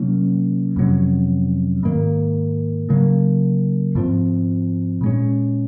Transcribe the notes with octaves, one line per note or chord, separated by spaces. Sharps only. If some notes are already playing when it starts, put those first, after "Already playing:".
Already playing: C3 F#3 A#3 C#4
F2 C3 F#3 C#4
G#2 D#3 A#3
C#3 F#3 A#3
G#2 F3 C4
A#2 G#3 C#4